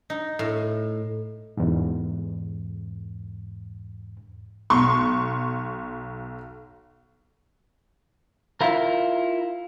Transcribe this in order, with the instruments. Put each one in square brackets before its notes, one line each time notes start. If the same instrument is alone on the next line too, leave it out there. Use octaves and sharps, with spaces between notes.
[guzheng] D#4
A2
[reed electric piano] E2 G#2
[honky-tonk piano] B1 C6 C#6
[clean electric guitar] E4 F4 A#4